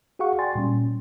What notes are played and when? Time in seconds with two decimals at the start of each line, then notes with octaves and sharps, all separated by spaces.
0.19 F#4 G#4 F5 F#5 C#6
0.38 D5 G5 G#5 C6 A6
0.55 A#2 G3 C#4